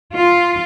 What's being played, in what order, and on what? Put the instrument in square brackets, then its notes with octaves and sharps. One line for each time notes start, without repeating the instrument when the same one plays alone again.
[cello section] F4